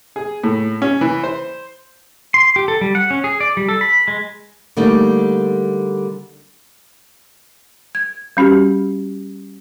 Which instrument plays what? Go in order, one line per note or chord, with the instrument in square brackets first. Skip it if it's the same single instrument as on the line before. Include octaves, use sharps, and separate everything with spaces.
[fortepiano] G#4
A2
C#4
E3
C5
[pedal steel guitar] C6
G4
A4
G3
F#5
C#4
G#4
D5
G3
A4
B5
G#3
[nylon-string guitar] D3 G3 A3 A#3 D#4
[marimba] G#6
G3 C#4 F#4 G4